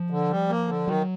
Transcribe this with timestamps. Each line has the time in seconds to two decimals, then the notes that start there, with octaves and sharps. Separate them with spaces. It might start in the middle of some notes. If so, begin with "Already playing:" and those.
Already playing: F3
0.10 D3
0.30 G3
0.49 A#3
0.68 D3
0.87 D#3 F#3